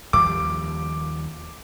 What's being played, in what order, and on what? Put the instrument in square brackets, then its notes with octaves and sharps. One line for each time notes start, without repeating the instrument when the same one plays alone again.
[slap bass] D#2 F3 G3 [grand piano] D6